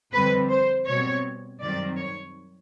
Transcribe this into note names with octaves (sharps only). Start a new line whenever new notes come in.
F2 D3 G3 C4 B4
C5
B2 G3 C4 C#5
F#2 D#3 G3 C4 D5
C#5